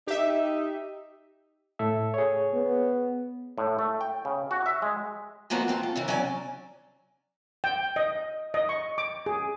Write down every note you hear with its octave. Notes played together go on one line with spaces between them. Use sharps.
D#4 G4 E5
A2 A4 E5
G#4 C#5
B3
A2
A3
G5
C#3
F#4
E5
G#3
F3 G#3 A#3 B3 F#4
F3 C4 F4 F#4
A4
C#3 E3 A#3
F#3 C#4 D5 G#5
G5
D#5
D#5
C#6
D6
G#4